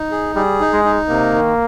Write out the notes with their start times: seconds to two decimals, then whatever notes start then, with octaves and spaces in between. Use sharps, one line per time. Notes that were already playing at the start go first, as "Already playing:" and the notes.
Already playing: D#4
0.11 G#4
0.35 G3 G#4
0.60 D#4
0.73 G#3
0.85 D#4
1.09 C3 A#3
1.34 D#3